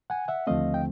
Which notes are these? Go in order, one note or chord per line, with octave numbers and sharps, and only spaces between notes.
F#5 G#5
E5 F#5
D#2 D3 F3 A3 C4 D#5 F5
G5